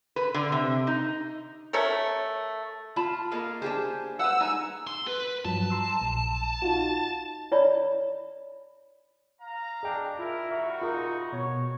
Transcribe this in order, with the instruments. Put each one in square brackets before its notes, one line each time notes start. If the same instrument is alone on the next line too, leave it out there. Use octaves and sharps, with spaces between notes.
[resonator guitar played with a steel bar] B4
D3
C3
D#4
[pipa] A3 C#4 A4 A#4
[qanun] F4 [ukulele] A5 B5
[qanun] A#3 F5 [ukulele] G#4 A4 D#5
[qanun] D4 G4 G#4 [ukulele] C5 A5
[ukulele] B4 C5 F#5 [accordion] E6
[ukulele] D#4 G#5 A#5
[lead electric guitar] C6
B4
[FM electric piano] G2 F3 F#3 [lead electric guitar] A5
[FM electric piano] A#5 C6 E6
A#1
D#4 F4 F#4
[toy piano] E4 C#5 D5 B5
[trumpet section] F5 A#5
[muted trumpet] D4 [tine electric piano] G#4 D#5 G5
[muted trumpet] E4 [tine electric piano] F4 [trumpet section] A#4
[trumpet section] G3 F#4 C#6 [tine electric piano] E5 A#5 F6
[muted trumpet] D#4 [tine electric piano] F4 G#4 A#4
[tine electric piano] B2 [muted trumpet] C#5